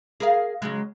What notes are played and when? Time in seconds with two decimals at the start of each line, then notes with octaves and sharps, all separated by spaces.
0.20 G#4 A#4 F5
0.62 C#3 F#3 G#3